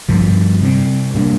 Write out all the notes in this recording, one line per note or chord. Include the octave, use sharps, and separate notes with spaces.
G2 D3 F3
C3 G3 C4
A2 G3 A#3 D4